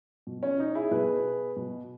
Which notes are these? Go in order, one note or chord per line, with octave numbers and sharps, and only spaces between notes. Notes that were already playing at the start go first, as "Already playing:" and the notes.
B2
C#4
D#4
E4 G#4
B2 G#4 B4
B2